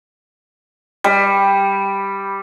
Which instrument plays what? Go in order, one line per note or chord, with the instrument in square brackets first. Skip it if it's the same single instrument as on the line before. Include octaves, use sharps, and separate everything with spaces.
[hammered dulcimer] G3